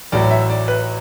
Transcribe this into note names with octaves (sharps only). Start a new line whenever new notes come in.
A1 A2 F#3 D5
E5
D5
B4